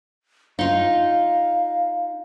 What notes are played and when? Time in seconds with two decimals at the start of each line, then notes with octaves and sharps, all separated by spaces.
0.59 D#4 F4 F5